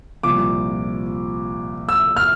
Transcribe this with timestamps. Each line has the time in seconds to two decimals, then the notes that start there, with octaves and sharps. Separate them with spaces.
0.23 C2 A#2 F3 D6
1.89 E6
2.16 F6